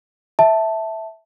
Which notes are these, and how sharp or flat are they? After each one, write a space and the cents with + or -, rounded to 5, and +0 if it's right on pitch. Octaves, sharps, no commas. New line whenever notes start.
E5 -10 A5 +0